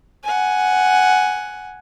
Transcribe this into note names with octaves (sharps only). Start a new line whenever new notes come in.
F#5 G#5